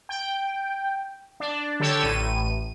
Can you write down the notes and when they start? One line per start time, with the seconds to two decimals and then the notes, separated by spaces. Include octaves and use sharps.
0.09 G5
1.40 D4
1.80 D3 G4 A4 C#5 E6
2.03 A1 A2 D#7